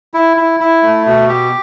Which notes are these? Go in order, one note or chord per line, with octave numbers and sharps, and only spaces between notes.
E4
E4
E4
A3
B2
G4